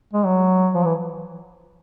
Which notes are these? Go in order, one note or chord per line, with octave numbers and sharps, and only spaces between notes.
G#3
F#3
F3
E3